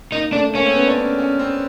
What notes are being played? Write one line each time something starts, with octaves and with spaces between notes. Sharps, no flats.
A#3 D#4
A3 D4
A#3 C#4
C4
B3
D4
C#4
C#4
C4